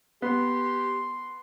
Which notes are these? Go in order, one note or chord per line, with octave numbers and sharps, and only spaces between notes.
B3 G4 C6